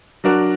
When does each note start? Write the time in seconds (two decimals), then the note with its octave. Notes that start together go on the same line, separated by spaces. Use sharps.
0.24 F#3 D4 F#4 A#4